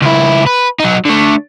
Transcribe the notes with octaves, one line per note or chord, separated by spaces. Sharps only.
C#2 E4
B4
F#3 D#4
D3 A3